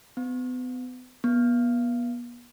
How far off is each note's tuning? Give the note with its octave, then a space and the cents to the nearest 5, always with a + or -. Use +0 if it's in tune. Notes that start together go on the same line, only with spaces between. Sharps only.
B3 +35
B3 -35